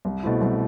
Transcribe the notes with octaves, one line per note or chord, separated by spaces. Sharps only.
C2
B2 A3 C4 E4
C2